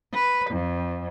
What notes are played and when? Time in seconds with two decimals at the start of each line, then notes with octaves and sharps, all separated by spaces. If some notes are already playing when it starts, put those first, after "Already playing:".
0.12 B4
0.50 F2